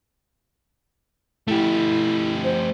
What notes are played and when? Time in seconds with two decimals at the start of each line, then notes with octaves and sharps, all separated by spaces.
1.48 A3 E4 G4
2.44 C5